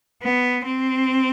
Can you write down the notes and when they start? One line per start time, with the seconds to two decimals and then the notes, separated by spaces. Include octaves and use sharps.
0.23 B3
0.65 C4